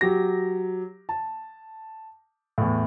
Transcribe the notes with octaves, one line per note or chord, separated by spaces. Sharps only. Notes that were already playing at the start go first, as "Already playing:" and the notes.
F#3 G4 A#6
A5
E2 A2